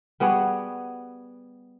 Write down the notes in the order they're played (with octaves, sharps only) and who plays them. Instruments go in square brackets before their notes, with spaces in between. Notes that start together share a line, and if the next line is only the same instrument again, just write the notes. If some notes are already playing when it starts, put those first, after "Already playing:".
[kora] G3 B3 F#4 G#4